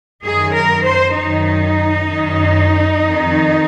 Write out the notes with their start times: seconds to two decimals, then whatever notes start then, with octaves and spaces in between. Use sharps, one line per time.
0.22 F#2 D#3 G#4
0.54 A#4
0.85 C5
1.15 F#2 D#3 D#4
2.08 F#2 D#3
3.01 F2 D#3